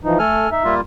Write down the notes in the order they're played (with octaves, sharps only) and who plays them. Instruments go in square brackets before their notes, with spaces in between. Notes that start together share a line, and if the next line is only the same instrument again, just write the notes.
[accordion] E3 F3 D#4
[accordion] A3 [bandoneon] A4 G#5 F6
[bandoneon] D#4 [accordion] E5
[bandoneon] G3 A#3 F4